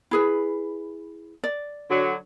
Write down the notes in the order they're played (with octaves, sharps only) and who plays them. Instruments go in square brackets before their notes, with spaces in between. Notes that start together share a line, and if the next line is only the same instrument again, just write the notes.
[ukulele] E4 G#4 B4
D5
[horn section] D3 F#3